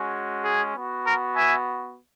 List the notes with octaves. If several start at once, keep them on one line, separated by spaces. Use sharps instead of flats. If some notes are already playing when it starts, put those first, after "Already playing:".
Already playing: G#3 C#4 F#4
G#4
B3 F#4
A#4
E5 G#5